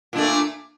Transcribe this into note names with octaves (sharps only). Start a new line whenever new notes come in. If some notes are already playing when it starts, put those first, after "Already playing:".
A#2 A3 D4